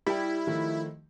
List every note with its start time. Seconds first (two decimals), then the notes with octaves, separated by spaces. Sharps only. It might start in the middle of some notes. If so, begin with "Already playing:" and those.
0.06 G3 E4 G4 G5
0.47 D#3 F3 A3